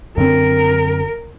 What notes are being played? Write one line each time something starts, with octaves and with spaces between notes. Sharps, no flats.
F#2 D3 C4 A#4